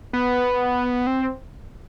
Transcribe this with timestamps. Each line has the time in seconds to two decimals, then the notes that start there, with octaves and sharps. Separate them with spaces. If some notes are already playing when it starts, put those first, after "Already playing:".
0.13 B3
1.07 C4